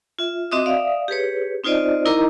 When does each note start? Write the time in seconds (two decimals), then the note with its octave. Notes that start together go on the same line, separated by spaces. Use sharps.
0.19 F4 E5
0.52 C4 F#4 D#5 E5 D6 D#6
0.66 D5 E5 F5 D#6
1.08 G4 G#4 B4 C#5
1.64 C4 D#4 F4 C5 D5 D#5
2.05 D#4 E4 A#4 D#5 A#5 D6